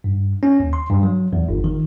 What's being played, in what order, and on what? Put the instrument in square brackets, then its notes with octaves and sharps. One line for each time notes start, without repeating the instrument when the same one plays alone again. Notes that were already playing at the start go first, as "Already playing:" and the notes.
[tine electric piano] G2
C#4
D#2
C6
G2
F#3
E2
G1
D#3